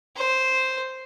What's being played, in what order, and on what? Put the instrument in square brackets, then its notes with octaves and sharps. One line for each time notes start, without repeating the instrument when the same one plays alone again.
[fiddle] C5